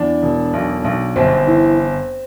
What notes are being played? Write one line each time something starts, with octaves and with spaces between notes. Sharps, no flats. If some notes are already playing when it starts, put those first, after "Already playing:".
Already playing: E2 D4
E1
B1
B1
G1 C4
E3